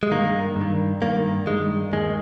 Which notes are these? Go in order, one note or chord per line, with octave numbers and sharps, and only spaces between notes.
G#3
G2 D#3 A#3
G2
D#3
G2 D#3 A#3
G2 D#3 G#3
D#2 D#3 G#3